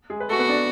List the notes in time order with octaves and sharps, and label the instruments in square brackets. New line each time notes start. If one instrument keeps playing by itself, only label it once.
[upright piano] G#3 G#4
B4
[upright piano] A3 A4 [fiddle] F#4
[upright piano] B3 B4
D4 D5